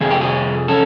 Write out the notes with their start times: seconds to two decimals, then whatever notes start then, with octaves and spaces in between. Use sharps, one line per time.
0.01 F2 C3 G#4
0.10 G4
0.21 G#4
0.68 C#4 A4